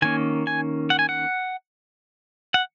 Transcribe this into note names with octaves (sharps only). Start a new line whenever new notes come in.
D#3 A#3 C#4 G#5
G#5
F#5
G#5
F#5
F#5